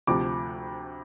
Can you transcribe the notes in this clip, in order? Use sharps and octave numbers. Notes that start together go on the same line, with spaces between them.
D2 C3 F3 D6